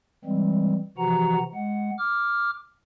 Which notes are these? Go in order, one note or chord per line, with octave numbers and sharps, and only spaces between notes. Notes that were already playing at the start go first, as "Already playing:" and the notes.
E3 G3 G#3 C4
C3 E3 F3 F#4 F#5 A#5
G#3 F#5
D6 F6